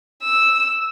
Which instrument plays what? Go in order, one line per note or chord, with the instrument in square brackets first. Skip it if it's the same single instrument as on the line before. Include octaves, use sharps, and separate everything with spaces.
[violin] E6